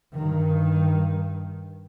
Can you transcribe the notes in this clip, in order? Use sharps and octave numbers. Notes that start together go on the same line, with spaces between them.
G2 D#3